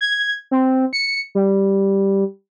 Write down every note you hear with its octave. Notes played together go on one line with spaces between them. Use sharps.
G#6
C4
C#7
G3